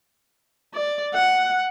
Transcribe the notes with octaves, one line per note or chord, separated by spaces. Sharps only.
D5
F#5